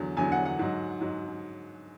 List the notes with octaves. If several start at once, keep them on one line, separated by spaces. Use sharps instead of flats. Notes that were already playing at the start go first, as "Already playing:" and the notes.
Already playing: E2 D3 F#3
E2 D3 F#3 G#5
F#5
F#5
G#2 F#3
G#2 F#3